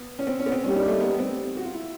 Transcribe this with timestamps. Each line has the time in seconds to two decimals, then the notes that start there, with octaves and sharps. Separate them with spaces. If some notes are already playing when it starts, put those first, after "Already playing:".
Already playing: B3
0.19 C#4
0.27 C4
0.40 C#4
0.46 B3
0.52 C4
0.64 G3 A#3 C#4 D#4 G4
0.76 D4
0.88 A3
1.01 B3
1.19 C4
1.57 F#4
1.65 F4
1.74 E4